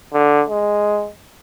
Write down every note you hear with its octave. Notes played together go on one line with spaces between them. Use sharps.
D3
G#3